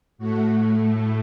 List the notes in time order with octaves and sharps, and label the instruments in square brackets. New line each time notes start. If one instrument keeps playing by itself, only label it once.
[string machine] A2 A3 F#4